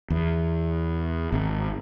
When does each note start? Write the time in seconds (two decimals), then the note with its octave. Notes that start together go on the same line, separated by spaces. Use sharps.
0.10 E2
1.32 G#1